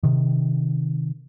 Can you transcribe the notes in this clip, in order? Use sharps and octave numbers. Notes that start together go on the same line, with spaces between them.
C3 D#3